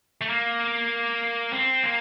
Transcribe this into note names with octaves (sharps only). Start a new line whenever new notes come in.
A3
A#3
C4
A#3